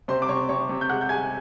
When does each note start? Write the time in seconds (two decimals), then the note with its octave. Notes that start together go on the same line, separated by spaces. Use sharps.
0.08 C3 C5 C6
0.22 D6
0.29 C3 C#5 C#6
0.49 C3 C#5 C#6
0.69 C3
0.81 G6
0.89 G#3 F#5 F#6
1.01 G6
1.09 G#3 G#5 G#6